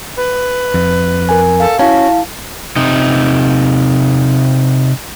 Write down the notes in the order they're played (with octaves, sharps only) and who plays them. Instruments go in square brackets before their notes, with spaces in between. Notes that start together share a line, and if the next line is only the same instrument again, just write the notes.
[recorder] B4
[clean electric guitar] F2
[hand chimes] A#4 G#5
[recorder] A4 [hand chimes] F5
[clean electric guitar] C#4 [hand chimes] E4 F5 A5 [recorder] F#4
[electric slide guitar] C3 D#4